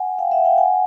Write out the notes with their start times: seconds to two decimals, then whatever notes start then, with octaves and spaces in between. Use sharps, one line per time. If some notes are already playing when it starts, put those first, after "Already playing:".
Already playing: F#5 G#5
0.18 F5 G5
0.31 E5 F#5
0.45 F5 G5
0.58 F#5 G#5